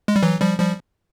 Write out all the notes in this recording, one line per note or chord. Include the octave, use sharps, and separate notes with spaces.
G#3
G3
E3 F#3
F3 G3
F3 G3